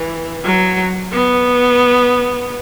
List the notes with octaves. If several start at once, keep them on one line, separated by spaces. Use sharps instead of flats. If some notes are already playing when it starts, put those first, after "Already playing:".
Already playing: E3
F#3
B3